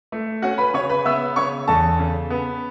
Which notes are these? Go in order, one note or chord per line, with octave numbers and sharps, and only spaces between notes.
A3
C#4 F#4 F#5
B4 B5
C#3 C#5 C#6
B4 B5
B3 E5 E6
C#3 C#5 C#6
E2 A4 A5
C#3
B3